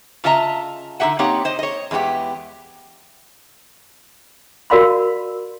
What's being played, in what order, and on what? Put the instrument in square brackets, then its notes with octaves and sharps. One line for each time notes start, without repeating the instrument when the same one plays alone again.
[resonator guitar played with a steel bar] C#3 F4 D#5 E5 A5 A#5
D3 D#4 G4 E5 F#5
A#3 C4 D#4 G4 C#5 F#5
C5 D#5
C#5 D#5
E2 G#3 B3 F4 G4
[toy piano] F#4 A#4 D5 F5 B5 C6